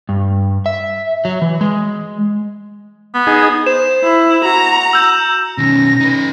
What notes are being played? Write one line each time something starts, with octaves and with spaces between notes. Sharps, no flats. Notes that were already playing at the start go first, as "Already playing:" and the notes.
G2
E5
F#3
E3
G#3
B3
D#4 G#4
C5 E7
E4
F#4 A#5
E6 G6 E7
B2 D#3 C#4 A#6
D#4 B4